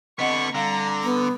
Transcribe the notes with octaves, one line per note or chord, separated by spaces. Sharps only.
D3 B3 C4 D#5 F#5 C#6
D3 G3 F5 A#5
B3